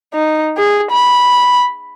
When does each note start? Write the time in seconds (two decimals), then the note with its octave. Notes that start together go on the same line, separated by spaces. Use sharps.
0.14 D#4
0.57 G#4
0.91 B5